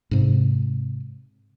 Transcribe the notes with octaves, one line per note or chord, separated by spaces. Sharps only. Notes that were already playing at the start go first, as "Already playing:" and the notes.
G#2 C3